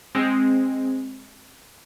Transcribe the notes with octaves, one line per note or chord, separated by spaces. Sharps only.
G#3 C4